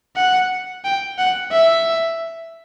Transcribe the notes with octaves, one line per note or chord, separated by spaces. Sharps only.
F#5
G5
F#5
E5